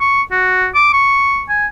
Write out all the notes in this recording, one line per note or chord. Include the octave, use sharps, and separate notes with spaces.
C#6
F#4
D6
C#6
G#5